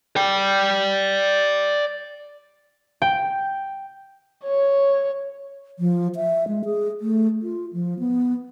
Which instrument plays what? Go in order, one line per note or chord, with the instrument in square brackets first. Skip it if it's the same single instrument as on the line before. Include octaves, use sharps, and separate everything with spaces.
[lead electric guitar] D5 G5
[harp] G5
[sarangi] C#5
[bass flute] F3
E5
G#3
G#4
A3
F4
F3
B3